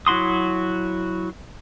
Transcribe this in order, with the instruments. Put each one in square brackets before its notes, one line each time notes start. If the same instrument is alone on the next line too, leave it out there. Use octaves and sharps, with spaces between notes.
[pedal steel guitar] F#3 E4 F#4 C6 D#6